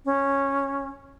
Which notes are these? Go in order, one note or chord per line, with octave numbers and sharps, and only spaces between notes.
C#4